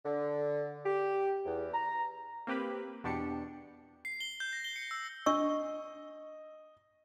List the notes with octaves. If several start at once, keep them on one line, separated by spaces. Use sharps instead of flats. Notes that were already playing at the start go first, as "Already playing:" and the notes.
D3
G4
E2
A#5
A#3 C4 G4 B4 B5
E2 B2 D4 G4 C#7
C7
G7
G6
A#6
G7
C#7
E6
D4 D#5 C#6 E6